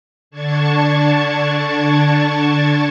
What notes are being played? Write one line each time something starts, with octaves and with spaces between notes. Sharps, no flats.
D3 D4 A5 C#6 G#6